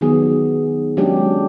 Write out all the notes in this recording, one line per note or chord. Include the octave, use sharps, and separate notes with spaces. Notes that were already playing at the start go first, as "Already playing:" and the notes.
D#3 F#3 B3 G#4
F#3 G#3 C#4 D4 G4